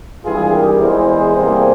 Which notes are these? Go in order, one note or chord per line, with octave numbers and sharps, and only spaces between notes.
G#1 G2 E3 G3 F4 G#4
G4 A#4
E2 E3 G#3 G#4 C5
E2 C3 G3 A#3